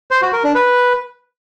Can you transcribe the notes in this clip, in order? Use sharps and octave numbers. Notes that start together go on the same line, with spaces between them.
C5
F#4
A#4
D4
B4